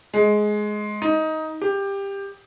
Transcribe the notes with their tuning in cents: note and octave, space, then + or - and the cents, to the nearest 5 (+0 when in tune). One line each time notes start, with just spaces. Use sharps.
G#3 +15
D#4 +15
G4 +15